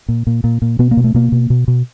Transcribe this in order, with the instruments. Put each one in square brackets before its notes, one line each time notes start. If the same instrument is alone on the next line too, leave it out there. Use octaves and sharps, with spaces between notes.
[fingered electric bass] A#2
A#2
A#2
A#2
B2 B3
A#3
B2
A3
B2 A#3
B2
B2
B2